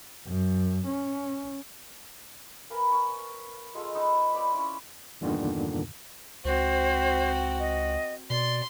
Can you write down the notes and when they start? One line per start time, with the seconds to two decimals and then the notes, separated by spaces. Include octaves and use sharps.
0.28 F#2
0.87 C#4
2.70 A#4 B4 F5 G#5
2.92 C#5 F5
3.75 G#3 F4 A4 F5
3.94 B3 D#4 A4
4.33 C4 D5 B5
4.53 C#4 E4 F4
5.21 E2 G2 A#2 D3 D#3
6.45 C#2 C4 F#4 C5
7.59 D#5
8.30 B2 D5 C6